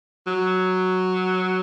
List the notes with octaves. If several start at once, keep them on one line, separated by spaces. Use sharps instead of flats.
F#3